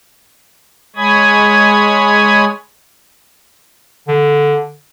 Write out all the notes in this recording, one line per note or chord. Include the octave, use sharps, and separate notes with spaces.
G#3 C#5 G#5 B5 D#6 G#6
D3